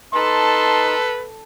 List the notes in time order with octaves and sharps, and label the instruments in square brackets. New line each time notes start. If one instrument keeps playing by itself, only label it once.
[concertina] D#4 A5 [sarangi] A4 [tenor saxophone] B4 [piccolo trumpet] C6